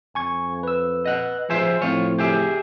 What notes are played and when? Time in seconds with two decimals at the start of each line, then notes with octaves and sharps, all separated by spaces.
0.15 F2 G#5 C#6 G#6
0.63 B4 E6
1.06 D#5 F#5
1.50 F3 G#4 C5 E5
1.82 A2 F3 C4 F4 C#5
2.19 G4 G#4 E5